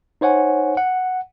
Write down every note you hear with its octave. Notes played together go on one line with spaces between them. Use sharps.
D#4 C5 C#5 F#5 G#5
F#5